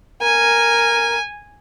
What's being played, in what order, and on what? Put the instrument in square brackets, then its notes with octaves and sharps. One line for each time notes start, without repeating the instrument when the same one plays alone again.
[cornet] A#4 [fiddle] G#5